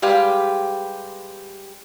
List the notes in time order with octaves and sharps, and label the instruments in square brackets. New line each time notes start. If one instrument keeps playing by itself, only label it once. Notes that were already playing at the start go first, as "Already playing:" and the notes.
[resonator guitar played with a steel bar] G3 G#3 G4 B4 F5